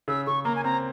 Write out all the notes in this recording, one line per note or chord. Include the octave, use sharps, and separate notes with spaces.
C#3 E6
C#3 C#6
A#3 A#5
G#5
C4 A#5